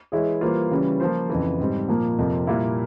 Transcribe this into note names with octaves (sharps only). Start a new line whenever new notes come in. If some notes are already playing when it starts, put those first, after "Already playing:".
E3 G#3 E4 G#4 C#5
E3 G3 A#3 F4 C5
C#3 E3 G3 C#4
F3 A#3 F4 C5
F2 C#3 E3
G#2 G3 C4
A#2 F3 A#3
F2 C3 F3 A#3
A#2 G3 A#3 E4